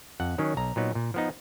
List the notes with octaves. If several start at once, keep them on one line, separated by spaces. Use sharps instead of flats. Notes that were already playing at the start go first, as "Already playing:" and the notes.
F2 F#5
D#3 F#3 C#4
B1 A#5
A#2 F#3 B3 D#4
A#2
F3 B3 D#4